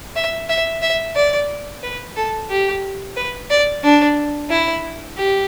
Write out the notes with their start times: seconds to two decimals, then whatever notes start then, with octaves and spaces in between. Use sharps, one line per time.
0.16 E5
0.49 E5
0.82 E5
1.15 D5
1.83 B4
2.17 A4
2.50 G4
3.16 B4
3.50 D5
3.83 D4
4.50 E4
5.17 G4